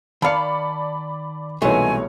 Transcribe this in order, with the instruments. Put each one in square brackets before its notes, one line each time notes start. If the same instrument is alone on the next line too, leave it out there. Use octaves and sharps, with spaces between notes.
[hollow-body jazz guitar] D#3 F5 [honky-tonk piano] D5 B5 [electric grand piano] A5 C#7
[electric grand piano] C2 B2 C#5 [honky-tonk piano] E3 D#4 [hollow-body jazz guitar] G#3 A3 [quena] G#5